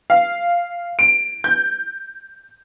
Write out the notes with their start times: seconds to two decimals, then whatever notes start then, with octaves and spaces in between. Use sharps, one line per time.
0.10 F5
0.99 D7
1.44 G6